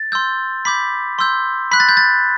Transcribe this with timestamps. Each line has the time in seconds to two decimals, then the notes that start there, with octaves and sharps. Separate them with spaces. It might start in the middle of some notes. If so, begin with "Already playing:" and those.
Already playing: A6
0.12 C6 E6 G6
0.65 B5 D6 G6 B6
1.19 C6 E6 G6
1.71 B5 F#6 B6
1.80 A6
1.89 G6
1.97 A6